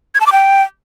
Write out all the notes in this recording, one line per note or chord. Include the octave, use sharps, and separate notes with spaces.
G#6
A5
D6
G5